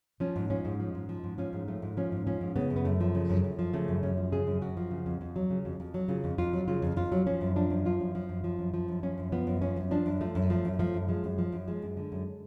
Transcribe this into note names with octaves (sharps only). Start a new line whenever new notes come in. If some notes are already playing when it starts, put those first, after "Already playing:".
F3 C#4
G#2
F3 C#4
G#2
F3
G#2
F3
G#2
F3 C#4
G#2
F3 A3
G#2
F3 C#4
G#2
F3 C#4
G#2
C#3 B3
F#2
B3
F#2 A3
F3
C#3
F#2
F#2
F3
C#3 A3
F#2
F#2 C#4
F3
C#3 G#4
F#2
F#2 F#4
F3
C#3
F2
F2
F#3
C#3
F2
F2
F#3
C#3 F4
F2
F2 F4
F#3
C#3 F4
F2
F2 F4
F#3
F3 C#4
F#2
F3 D4
F#2
F3 F4
F#2
F3
F#2
F3
F#2
F3
F#2
F3 C#4
F#2
F3 B3
F#2
F3 C#4
F#2
F3 D4
F#2
F3 A3
F#2
F3 A3
F#2
F3 A3
F#2
F3 G#3
F#2
F3
F#2
F3 G#3
F#2
D3
F#2